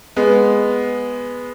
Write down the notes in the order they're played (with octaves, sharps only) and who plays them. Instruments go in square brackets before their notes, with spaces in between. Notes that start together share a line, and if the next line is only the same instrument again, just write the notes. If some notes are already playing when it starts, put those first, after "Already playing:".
[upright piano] G#3 B3